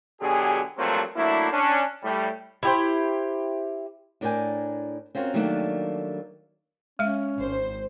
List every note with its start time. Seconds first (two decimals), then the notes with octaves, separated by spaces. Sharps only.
0.20 B2 D3 F#3 G4 G#4
0.78 G2 F3 F#3 A3 A#3 C4
1.16 F#3 A3 A#3 D4 E4
1.51 C#4 D4
2.03 A2 G3
2.63 E4 G4 C5
4.21 A2 D4 A#4 D5 G5 G#5
5.15 C4 C#4 F4 F#4 A#4
5.34 D#3 F#3 G3 A3 A#3 D4
6.99 G#3 C#4 E5
7.37 G#1 C5